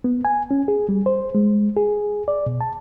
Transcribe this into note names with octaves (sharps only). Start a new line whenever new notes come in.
B3
G#5
C#4
G#4
G3
C5
G#3
G#4
D5
B2
A5